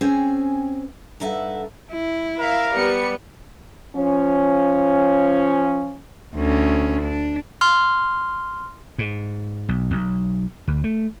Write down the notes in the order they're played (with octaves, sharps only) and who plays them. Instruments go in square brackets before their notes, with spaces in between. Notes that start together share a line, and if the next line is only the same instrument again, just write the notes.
[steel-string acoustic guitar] C4 C#4 G#4 C5 G5 G#5
G2 D#4 A4 E5 F#5
[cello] E4
[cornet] A#4 [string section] E5 F5
[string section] G3 C#7 [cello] B3
[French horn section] F3 C#4
[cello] D2 C#4
D4
[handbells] C6 F6
[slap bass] G#2
B1
B1
D2
A3